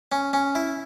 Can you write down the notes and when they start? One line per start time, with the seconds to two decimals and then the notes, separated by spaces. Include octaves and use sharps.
0.12 C#4
0.33 C#4
0.55 E4